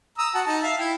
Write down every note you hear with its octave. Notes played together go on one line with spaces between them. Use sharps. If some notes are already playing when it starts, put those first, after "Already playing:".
A#5 D#6 E6
F#4 F#5 A5
D#4 A5
E5 F5
E4 G5